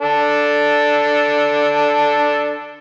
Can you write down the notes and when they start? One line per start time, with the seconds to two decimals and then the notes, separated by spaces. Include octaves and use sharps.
0.01 D4 A4